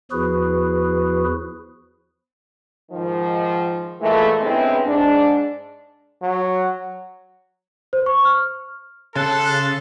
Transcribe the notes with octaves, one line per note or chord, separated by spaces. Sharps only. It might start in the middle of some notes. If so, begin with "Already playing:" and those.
E2 F3 E4 F#4 G#4 B4
G#2 D#3 F3
A#2 E3 G#3 A3
G2 C#3 G#3 B3 C4 E4
G#2 D4
F#3
C5
C#6
F6
C#3 A4 A5 C6 F#6